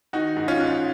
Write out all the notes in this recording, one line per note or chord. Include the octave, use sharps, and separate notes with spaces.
D#3 D#4 F#4
G#2
C#4 F4
G#2